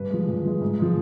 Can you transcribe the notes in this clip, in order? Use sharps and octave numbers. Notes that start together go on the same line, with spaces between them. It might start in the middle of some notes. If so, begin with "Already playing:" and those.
Already playing: G2 B4
F3 G#3
G2
F3 G#3
G#2
F3 G#3